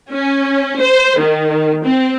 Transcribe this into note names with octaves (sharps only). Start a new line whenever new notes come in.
C#4
C5
D#3
C4